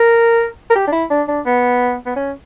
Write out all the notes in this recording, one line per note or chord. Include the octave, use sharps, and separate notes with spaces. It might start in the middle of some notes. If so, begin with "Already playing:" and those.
Already playing: A#4
A#4
G4
D4
E4
D4
D4
B3
B3
C#4